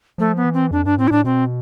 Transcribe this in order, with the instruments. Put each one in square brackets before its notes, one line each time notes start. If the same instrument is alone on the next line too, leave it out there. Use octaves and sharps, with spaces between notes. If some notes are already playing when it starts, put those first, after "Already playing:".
[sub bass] F3 [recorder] A3
[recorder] B3
[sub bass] E3
[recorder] C4
[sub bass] F2 [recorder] D4
[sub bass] G2 [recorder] D4
[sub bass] A2 [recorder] C4
[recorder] E4
[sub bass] A2 [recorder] D4
[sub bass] B2 [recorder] C4